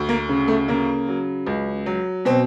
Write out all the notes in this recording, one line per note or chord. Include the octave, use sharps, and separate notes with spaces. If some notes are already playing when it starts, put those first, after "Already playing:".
Already playing: D2
A#3
C#3
A3
C#3 A#3
F#3
C#2
F#3
B2 C4